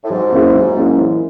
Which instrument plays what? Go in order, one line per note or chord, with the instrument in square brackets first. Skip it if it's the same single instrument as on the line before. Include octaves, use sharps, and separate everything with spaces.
[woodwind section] A2
[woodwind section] G#2 [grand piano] F#3
[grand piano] A#3 C#4 E4 G#4
F#3
A#3 C#4 E4 G#4
E3